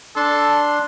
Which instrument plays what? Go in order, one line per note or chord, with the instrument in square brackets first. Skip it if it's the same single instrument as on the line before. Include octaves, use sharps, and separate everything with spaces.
[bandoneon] D4 C6 [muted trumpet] A4